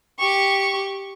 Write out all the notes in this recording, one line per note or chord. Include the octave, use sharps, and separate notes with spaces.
G4 C#6